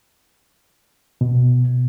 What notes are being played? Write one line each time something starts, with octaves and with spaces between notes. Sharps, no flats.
B2